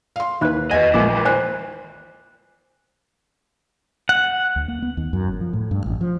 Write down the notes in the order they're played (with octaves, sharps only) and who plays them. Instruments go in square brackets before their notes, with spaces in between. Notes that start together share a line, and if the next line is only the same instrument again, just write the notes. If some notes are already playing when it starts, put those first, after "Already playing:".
[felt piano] F5 C6
[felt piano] D#2 [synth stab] E3 B4 [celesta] D#4 B5 F#6
[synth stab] E2 G#5 [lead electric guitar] B4 D#5 [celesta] F#5
[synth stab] A#1 F3 A#3 [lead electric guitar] G#3 E4 [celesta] D#5 G#5 D6
[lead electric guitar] D#3 E3
[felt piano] C5 [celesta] G#5 F#6
[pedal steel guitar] F#5
[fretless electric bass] D2
A#3
B3
D#2
F#2
G1
F3
A2
G2
A1
F3